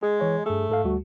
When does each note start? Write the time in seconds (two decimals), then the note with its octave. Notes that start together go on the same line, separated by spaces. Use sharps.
0.03 G#3 G#4
0.20 E3 C#5 D#5
0.46 G2 A3 G#4
0.70 G#2 A4 F5
0.84 D2 G3 F#4